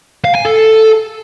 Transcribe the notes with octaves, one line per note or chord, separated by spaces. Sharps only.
F5
G#5
A4